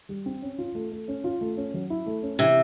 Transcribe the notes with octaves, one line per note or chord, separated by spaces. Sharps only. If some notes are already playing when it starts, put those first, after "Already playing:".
G3
C4
C#4
F4
A3
A3
C#4
F4
A3
C#4
F#3
E4
A3
C#4
C3 E3